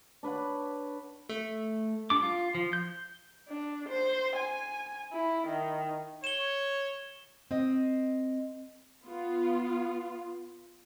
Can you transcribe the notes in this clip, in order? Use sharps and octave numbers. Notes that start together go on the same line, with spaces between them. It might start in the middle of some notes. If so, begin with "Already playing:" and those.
D4 B4 C#5 F#5
A3
G3 D4 D6
F4
F3
G6
D4
C5
G#5
E4
D#3
C#5 E7 G7
C4 D#5
B3 F4